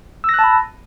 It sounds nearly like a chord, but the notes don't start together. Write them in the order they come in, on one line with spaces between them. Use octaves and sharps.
E6 A#6 F#6 A5 B5